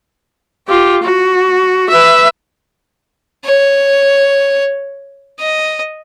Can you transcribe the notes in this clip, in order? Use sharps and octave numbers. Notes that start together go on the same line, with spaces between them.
F4 G4
F#4
B4 E5
C#5
D#5